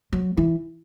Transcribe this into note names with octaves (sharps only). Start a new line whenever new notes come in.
F#3
E3